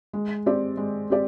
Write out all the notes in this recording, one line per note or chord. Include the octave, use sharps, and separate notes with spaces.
G#3
C4 G4 D5
G#3
C4 G4 D5